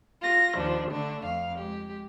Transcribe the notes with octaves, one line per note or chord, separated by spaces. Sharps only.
F4 A#6
D#2 F3 D4
D3 A3 D4
F2 F5
G#3 G4